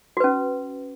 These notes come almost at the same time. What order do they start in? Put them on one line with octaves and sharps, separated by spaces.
F#4 B4 C#4